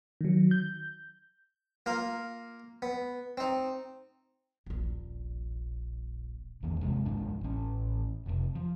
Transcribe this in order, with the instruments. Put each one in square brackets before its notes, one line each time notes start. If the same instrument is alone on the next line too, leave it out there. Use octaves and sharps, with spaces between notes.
[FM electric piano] D#3 F#3
G6
[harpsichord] A#3 F4 A#4
B3
C4 D#4
[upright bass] D#1 A#1
[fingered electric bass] D1 E2 D#3
G1 C3 G#3
G1 C#2 G#2 D4
A1 C#4
F1 C3
F3